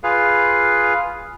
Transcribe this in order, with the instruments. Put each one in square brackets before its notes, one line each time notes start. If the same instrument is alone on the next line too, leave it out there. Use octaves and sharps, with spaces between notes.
[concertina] F4 G#4 B4 F5